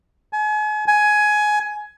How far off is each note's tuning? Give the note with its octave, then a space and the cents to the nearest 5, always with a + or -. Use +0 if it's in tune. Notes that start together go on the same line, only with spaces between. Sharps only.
G#5 +35
G#5 +15